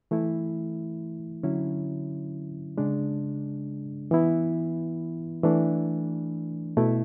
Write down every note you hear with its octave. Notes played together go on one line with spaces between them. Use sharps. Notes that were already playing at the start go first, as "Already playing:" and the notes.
E3 A3 E4
D3 F#3 C#4 E4
C#3 G#3 D4
E3 B3 E4
E3 A3 D4
B2 A3 E4